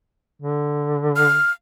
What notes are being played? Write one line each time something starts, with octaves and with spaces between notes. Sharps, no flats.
D3
F6